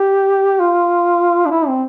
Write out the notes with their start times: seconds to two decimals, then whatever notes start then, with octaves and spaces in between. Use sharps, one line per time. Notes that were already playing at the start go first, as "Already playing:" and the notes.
Already playing: G4
0.59 F4
1.46 D4
1.51 E4
1.67 C4